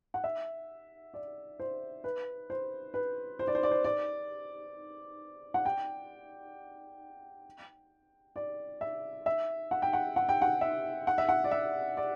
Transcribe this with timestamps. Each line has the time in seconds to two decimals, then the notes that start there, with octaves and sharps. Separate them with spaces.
0.14 F#5
0.24 E5
1.14 D5
1.60 C5
2.04 B4
2.50 C5
2.94 B4
3.39 C5
3.47 D5
3.55 C5
3.63 D5
3.71 C5
3.84 D5
5.54 F#5
5.65 G5
8.36 D5
8.81 E5
9.26 E5
9.71 F#5
9.82 G5
9.93 F#5
10.16 F#5
10.29 G5
10.42 F#5
10.61 E5
11.07 F#5
11.18 E5
11.29 F#5
11.44 D5
11.51 E5
11.97 D5